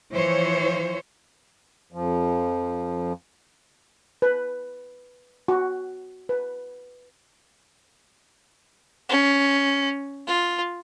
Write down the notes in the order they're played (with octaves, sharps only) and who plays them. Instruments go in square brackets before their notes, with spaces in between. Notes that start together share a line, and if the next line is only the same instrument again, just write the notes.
[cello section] E3 F3 C5 C#5
[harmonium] F2 F3
[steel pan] B4
F#4
B4
[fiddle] C#4
F4